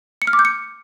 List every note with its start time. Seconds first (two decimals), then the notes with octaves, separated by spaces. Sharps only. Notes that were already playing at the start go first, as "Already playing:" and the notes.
0.22 C#7
0.27 F6
0.33 D6
0.39 G6
0.45 C#7